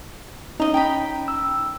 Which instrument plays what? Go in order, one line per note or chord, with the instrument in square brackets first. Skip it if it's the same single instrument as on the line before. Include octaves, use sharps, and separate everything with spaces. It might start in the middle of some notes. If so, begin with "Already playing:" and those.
[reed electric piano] C#4 D#4 [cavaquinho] D#5 A#5
[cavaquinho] G5 A#5 B5
[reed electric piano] E6